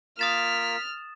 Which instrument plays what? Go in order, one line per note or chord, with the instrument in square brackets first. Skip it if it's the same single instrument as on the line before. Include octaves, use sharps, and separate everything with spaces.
[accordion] A#3 F4 A#4 [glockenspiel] D#6 A6 E7 [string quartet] F6 [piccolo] B6